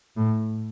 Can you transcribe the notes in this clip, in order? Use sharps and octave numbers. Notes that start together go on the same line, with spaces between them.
A2